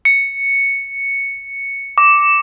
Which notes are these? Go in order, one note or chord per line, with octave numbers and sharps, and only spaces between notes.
C#7
D6